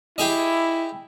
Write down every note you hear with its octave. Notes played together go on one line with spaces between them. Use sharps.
E4 G4 G#4 D#5